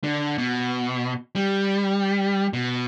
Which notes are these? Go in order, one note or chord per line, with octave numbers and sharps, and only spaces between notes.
D3
B2
G3
B2